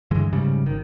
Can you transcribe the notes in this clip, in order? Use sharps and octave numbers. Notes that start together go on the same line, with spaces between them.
G2 D3 E3 G#3
F1 G#2 C#3 G3
G#1 D#3